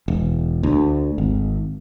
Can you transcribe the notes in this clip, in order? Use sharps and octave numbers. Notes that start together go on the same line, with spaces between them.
E1
D2
G#1